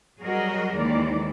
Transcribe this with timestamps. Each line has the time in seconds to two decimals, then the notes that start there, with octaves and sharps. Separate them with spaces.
0.19 F#3 G3 F#4 G#4 A#4 D#5
0.75 D#2 D#3 E3 G#3 D5